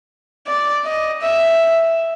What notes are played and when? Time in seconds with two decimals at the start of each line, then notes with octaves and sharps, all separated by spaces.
0.47 D5
0.85 D#5
1.22 E5